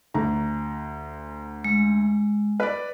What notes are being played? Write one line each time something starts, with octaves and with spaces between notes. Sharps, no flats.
D2 A#5
G#3
B4 D5